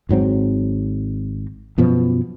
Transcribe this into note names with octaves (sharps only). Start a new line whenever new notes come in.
G#1 G#2 F#3 C4
F#2 B2 F3 B3